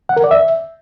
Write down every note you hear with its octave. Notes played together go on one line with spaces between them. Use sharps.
F#5
A#4
D5
E5